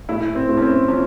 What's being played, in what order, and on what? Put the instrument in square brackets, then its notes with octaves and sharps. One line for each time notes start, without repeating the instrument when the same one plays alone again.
[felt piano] A2 E4
C4
A2
C#4
C4
F3 C#4